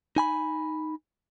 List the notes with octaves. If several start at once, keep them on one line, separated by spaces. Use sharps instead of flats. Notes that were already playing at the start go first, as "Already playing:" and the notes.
D#4 G#5 B5